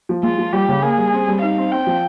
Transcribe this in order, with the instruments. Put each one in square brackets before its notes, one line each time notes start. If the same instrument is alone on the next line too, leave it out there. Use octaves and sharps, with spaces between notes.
[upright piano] F3
[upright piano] G#3 [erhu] F4
[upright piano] F3
[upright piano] G3 [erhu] G4
[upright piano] C#3
[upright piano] A#3 [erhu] G#4
[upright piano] G3
C4
G3
[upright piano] D#4 [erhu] F5
[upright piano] C4
[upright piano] C4 [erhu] G5
[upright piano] F3